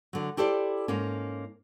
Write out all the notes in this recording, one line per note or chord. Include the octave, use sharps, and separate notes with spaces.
D3 F#3
E4 G4 A4 C5 D5
G#2 A#3 C#4